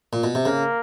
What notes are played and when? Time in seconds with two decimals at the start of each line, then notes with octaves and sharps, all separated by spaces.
0.13 A#2
0.24 B2
0.35 C3
0.45 C#3 A#3